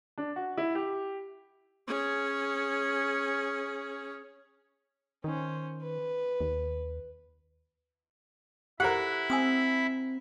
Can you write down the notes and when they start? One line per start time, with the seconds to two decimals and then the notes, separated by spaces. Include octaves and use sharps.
0.18 D4
0.36 F#4
0.58 E4
0.75 G4
1.88 C#4 G#4
5.24 D#3 C#4 C5
5.82 B4
6.40 D#2
8.80 E4 G4 A4 A#4 C5 F#5 B5
9.30 C4 G#5 D#6 E6